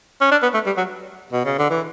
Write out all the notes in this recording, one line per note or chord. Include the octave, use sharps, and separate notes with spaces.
C#4
D4
B3
A3
G3
F#3
B2
C#3
D3
E3